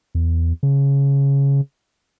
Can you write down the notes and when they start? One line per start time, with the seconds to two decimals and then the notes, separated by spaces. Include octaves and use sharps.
0.15 E2
0.63 C#3